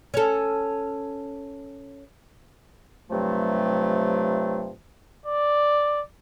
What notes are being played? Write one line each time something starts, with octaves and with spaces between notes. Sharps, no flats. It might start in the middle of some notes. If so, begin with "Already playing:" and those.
C#4 A4
G2 C3 F3 F#3 A3
D5